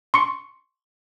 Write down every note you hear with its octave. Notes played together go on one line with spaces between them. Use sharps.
C6 C#6 C#7